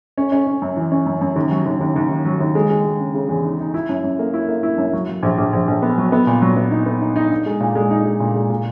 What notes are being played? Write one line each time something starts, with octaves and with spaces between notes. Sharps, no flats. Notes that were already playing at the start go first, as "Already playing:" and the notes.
C#4
C#4
C#4
F#2
E3
C#4
F#2
F#2
D#2
F#3
D#2
D#2
D#2
D#3
F#3
D#2
G#3
G#3
G#3
C#3
C#3
E2
D#4
D#4
E4
F#2
F#2
A#3
E4
A#3
E4
F#2
F#3
F#3
A#1
A#1
A#1
A#1
B3
F#3
B3
A#2
F#3
B3
D#4
B3
D#4
D#4
D#4
G#3
A#2
G#3
D#4
G#3
A#2
G#3
A#2